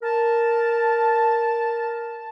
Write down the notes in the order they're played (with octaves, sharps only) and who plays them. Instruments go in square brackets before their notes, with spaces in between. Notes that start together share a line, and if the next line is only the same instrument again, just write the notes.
[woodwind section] A#4 A5